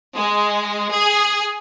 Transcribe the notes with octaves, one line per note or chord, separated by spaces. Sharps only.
G#3
G#4